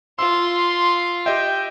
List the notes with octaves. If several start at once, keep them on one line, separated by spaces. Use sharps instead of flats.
F4 C6 E6
G4 D#5 E5 G5